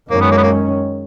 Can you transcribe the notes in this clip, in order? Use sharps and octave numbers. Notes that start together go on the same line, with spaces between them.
F#2 D#3 G#3 A#3 C#4
B3
A#3
B3
A#3